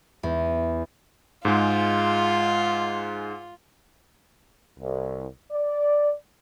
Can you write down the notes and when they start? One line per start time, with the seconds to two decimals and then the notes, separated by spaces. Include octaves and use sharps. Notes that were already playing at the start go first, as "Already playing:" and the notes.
0.23 E2
1.45 G#2 G#3 F4
4.78 C2
5.52 D5